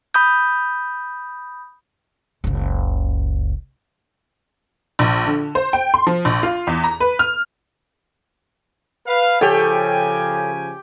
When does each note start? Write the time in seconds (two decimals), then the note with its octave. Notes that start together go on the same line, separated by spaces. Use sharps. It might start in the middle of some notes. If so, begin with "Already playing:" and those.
0.14 B5 D#6 G6
2.44 F#1 C#2
4.99 A#1
5.26 D3
5.55 C5
5.73 G5
5.94 C6
6.07 F3
6.25 A#1
6.43 F4
6.67 E2
6.84 A#5
7.00 B4
7.19 F6
9.08 B4 F5
9.41 C#3 F3 G4 A4 C#5 G5 G#5